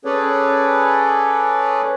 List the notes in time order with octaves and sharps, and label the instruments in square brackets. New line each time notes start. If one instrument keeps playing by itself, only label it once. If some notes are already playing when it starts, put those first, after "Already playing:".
[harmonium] C#4 G#4 A4 B4 C#5 D5